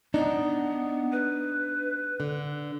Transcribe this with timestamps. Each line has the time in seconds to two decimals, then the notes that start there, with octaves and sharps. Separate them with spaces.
0.14 B3 D4 D#4
1.12 B4
2.20 D3